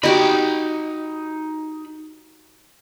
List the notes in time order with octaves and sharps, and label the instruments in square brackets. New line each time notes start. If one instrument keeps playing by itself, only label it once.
[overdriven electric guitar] D#4 B5 [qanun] F#4 G4 D#5